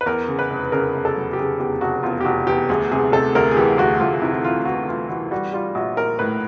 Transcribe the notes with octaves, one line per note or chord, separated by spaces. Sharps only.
B4
E2 A#4
C#3
B4
F1
C#3 A#4
F1
A4
F#3
G4
C#3 G#4
E2 G4
F1 F#4
E2 F4
G4
F1 F#4
E2 G4
D2 G#4
C3 G#4
C3 A4
D2 A#4
G#4
E3 G4
D2 F#4
D2 F4
C3 E4
E4
E3 F4
E3 F#4
E3 F4
E3 F#4
G3 F#4
G3 F4
A#1 F#4
A#1 A#4
A2 B4